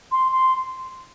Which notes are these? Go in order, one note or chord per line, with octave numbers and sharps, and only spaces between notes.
C6
C6